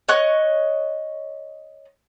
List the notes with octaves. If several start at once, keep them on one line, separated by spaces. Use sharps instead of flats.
C#5 D#5 C#6 F#6